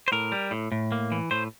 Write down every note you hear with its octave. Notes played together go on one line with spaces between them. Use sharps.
C5
A2 A#4
G3
A2
A2
A#3
E3
A2 C5